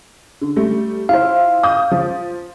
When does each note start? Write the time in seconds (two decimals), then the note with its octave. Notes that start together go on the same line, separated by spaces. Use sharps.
0.42 D3
0.56 G3 A3
1.09 E4 F4 C5 F5
1.63 D#6 G6
1.91 F3